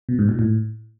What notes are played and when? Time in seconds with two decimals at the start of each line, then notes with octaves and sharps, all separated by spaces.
0.09 B2
0.19 G#2
0.29 A#2
0.39 A2